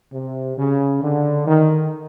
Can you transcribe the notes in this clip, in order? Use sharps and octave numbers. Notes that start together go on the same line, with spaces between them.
C3
C#3
D3
D#3